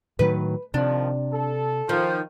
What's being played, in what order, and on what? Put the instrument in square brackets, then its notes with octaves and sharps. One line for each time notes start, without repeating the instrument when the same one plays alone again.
[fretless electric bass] A2 D#3 F#3 [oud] B4
[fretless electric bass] C3 [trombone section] D#3 F3 [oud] D4
[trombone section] A4
[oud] D#3 [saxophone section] F3